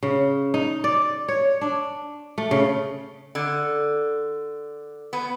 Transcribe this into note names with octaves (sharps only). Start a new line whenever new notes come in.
C#3
D#4
D5
C#5
D4
A3
C#3
D3
B3